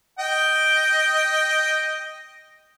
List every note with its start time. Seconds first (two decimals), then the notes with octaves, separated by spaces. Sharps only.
0.19 D#5 G5